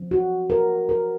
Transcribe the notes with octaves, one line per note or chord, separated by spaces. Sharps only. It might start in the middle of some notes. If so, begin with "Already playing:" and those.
Already playing: F3 C4
F#4
A#4
A#4